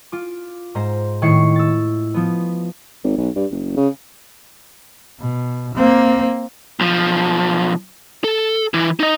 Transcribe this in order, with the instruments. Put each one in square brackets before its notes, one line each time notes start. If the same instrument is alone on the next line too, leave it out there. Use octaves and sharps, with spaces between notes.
[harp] F4 D6
G#2 C5 A#5
A2 D#3 E4 C#6 C7 C#7
E6 A6
F3 B3
[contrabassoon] G#1
B1
G2
F#1
C#3
[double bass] B2
A#3 C4
[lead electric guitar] B1 F3
A4
E3 E4
D#4 D#5